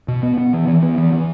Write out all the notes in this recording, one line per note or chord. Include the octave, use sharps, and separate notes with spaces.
B2
B3
B3
E3
E3
B3
E3
E3